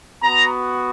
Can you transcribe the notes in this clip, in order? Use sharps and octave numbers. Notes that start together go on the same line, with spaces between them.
B3 F#4 A#5